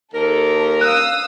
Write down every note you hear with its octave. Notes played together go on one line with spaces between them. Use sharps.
D#2 A4 A#4
F5 D#6 E6 F#6